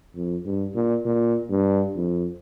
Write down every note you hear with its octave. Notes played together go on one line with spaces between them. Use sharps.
F2
G2
A#2
A#2
G2
F2